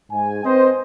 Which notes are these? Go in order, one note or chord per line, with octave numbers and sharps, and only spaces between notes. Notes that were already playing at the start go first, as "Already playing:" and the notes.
G#2 G#5
C4 B4 C5 D#5